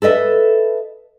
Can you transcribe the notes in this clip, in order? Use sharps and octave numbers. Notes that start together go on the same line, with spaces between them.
A4 B4 D#5 E5